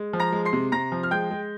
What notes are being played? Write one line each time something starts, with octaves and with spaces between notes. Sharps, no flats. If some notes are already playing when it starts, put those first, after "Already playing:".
Already playing: G#3
F3
A#5 A#6
G#3
C6 C7
C3
C3 A#5 A#6
F3
F6
G#3 G5 G6
G#3